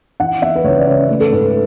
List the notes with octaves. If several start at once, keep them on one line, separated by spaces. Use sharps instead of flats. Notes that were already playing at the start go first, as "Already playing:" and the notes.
E3 F#5
B3 E5
B4
C#2 C#5
D5
C#3 C#5
A3 B4
A4
G#2 B4